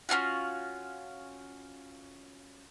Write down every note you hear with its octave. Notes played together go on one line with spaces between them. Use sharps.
C#4 D#4 F4 F#4